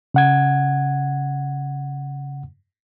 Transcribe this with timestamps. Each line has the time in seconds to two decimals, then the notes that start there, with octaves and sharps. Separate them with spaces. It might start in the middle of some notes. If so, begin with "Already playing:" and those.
0.14 C#3 F#5 G#6